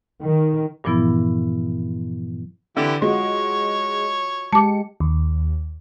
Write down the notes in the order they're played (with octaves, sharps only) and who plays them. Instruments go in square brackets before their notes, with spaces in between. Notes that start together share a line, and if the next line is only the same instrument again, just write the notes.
[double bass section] D#3
[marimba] G2 A#2 E3 F3 B3 E4
[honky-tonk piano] D3 [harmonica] E3 E4 G4
[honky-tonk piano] G#3 [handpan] F4 F#4 D#5 [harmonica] C#5
[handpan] G#3 G4 [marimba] A5 D6 [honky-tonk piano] C#7
[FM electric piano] D#2